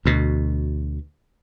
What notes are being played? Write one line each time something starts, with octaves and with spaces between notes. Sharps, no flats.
D2 B2